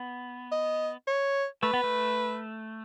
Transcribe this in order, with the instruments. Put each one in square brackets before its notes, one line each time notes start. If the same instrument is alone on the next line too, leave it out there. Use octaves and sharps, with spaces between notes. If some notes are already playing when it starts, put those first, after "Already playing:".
Already playing: [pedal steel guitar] B3
[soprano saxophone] D#5
C#5
[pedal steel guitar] A3 [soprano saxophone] B4
[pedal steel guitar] B3
A3